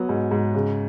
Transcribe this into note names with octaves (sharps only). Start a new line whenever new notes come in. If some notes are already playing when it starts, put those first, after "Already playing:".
Already playing: F#3 B3
G#2
G#2
C#3